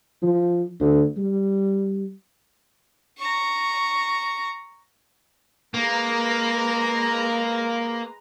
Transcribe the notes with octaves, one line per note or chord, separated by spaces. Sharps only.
F3
D2
G3
A#5 C#6
G#3 A#3 B4 A#5